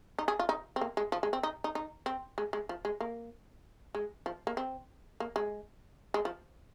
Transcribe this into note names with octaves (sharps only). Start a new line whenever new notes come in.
D#4
G#4
F4
D#4
C4
A#3
G#3
F3
G#3
C4
D#4
D#4
D#4
C4
G#3
G#3
F3
G#3
A#3
G#3
F3
A#3
C4
A#3
G#3
G#3
F3